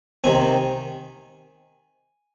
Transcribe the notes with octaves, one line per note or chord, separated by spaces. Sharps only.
C3 D#3 C4 G#5